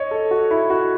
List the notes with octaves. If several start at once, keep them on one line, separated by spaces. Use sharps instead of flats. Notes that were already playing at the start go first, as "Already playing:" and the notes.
Already playing: C#5 D#5
A4
F#4
E4
F#4